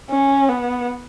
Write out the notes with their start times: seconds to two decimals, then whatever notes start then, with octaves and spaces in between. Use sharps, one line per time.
0.10 C#4
0.49 B3